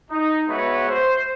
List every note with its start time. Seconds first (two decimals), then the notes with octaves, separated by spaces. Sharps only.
0.11 D#4
0.48 G#3 B3 F#4 B4 C#5 E5
0.89 C5